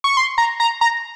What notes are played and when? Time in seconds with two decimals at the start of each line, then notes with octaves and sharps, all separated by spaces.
0.04 C#6
0.17 C6
0.38 A#5
0.60 A#5
0.81 A#5